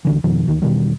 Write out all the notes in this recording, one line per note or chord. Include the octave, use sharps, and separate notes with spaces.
C2 D3 E3
F2 B2 D#3 F3
D2 D#3
E1 B2 D#3 G3